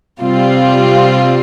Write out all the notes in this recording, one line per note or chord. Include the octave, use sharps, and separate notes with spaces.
C3 G3 C4 F4